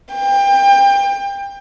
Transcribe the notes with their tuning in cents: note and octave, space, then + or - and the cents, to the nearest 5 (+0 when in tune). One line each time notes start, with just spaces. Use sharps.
G5 +25